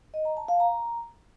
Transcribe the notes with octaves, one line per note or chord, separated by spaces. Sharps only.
D#5
A#5
A5
F5
A#5